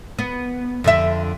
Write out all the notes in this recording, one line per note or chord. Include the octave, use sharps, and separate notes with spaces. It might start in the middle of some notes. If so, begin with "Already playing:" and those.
B3
F2 D3 E5